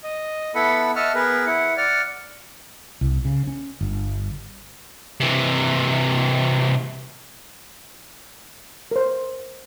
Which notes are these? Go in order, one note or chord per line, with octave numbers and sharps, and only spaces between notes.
D#5
B3 E4 A4 F#5 B5
D#5 E5 F#5 A5 C#6 F6
B3 G#4 A#4 B4
E4 F#5
D5 F#5 F6
C2
C#3
C#4
G1
C3 E3
A#4 C5